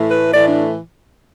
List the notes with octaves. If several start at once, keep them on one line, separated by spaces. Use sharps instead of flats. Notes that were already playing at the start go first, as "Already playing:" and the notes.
Already playing: A2 E3 A3
B4
A2 E3 A3 D5
D4